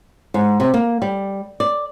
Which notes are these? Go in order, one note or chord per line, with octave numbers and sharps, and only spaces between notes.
G#2
C3
A#3
G3
D5